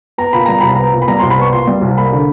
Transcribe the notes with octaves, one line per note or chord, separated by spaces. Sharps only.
B3 A#5
A#2 B5
G3 A#5
C2 B5
B3 A#5
A#2
B5
G3 A#5
C6
C2
B5
B3 C#6
A#2 C6
G3
C2
A#3 B5
D3